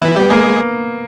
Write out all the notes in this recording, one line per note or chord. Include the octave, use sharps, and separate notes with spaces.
E3 B3 E4
G3 B3 G4
G#3 A#3 G#4